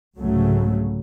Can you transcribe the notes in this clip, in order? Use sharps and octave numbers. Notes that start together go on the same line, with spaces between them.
C2 G#2 C#3 F#3 A3